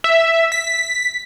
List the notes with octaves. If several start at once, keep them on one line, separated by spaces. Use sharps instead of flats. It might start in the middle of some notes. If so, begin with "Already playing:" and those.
E5
B6